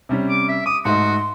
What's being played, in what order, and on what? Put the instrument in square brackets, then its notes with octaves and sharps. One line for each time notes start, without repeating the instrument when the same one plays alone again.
[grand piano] C3 G3 C#4
[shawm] D6
E5
[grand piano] D6 [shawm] D#6
[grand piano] G#2 A3 D#4 [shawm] F#4 [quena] C6